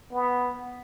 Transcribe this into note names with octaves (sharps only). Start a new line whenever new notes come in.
B3